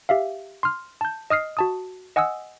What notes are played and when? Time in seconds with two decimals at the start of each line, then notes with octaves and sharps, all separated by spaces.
0.09 G4 E5 F5
0.63 C6 F6
1.01 A5 G6
1.30 D#5 D#6 F6 C7
1.57 F#4 A5 D#6
2.16 D#5 F#5 G#5 D#6 E6